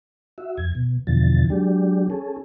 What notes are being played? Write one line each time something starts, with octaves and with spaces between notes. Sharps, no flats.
F#4 E5
F2 G#6
B2
E2 B2 D3 E3 F3 A6
F#3 G#3 D4 G4
C#4 G#4 A4